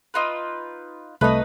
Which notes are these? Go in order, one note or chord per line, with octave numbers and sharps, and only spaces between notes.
D#4 F4 B4
C2 A3 D#4 B4 D#5